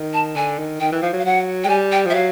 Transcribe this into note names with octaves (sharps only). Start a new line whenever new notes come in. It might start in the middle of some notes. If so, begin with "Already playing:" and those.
Already playing: D#3
A5
D3 G#5
D#3
D#3 G5
E3
F3 F5
F#3
F5
F#3 F#5
G#3 G5
G3 G#5
G5
F3
E5
F#3 F5